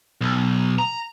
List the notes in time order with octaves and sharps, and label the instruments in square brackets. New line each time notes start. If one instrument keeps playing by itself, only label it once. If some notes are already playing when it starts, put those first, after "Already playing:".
[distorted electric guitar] B1
A#5